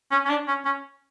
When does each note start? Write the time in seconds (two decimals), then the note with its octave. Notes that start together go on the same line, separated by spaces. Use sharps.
0.11 C#4
0.25 C#4
0.29 D4
0.48 C#4
0.65 C#4